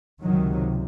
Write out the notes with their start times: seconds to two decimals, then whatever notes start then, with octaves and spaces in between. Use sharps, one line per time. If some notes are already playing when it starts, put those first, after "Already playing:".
0.20 C#2 C3 D#3 F#3